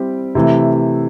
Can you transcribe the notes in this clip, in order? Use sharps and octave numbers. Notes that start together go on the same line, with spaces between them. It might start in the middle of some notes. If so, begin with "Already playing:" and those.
Already playing: G3 C4 E4 G4
C3 E3 A3